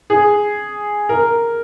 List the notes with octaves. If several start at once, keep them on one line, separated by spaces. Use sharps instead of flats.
G#4
A#4